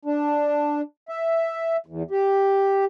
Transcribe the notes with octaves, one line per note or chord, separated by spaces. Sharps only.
D4
E5
E2
G4